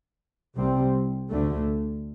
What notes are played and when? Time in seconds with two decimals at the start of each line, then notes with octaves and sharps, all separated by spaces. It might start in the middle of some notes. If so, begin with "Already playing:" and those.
0.55 C2 C3 G3 C4
1.30 D2 D3 A3